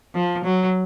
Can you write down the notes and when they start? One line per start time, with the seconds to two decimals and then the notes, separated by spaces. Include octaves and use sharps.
0.15 F3
0.44 F#3